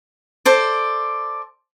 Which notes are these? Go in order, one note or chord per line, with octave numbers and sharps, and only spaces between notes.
A4 C5 D5